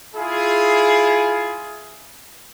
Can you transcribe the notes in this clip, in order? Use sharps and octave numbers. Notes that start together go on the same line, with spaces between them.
E4 F4 G#4